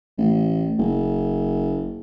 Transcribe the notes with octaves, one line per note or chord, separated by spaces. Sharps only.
A1
F#1